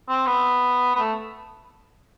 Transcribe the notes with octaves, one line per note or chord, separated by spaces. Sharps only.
C4
B3
B3
A3